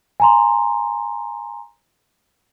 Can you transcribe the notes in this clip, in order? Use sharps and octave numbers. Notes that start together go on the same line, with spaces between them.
G#5 A#5 C6